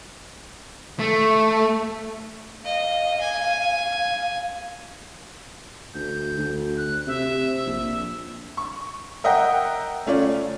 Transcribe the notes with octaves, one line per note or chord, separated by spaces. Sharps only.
A3
D#5 F5
G#5
D2 G6
D2
F#6
C3 E5
A#1
C#6
A#4 D#5 E5 F#5 G5
A3 C#4 F4 D5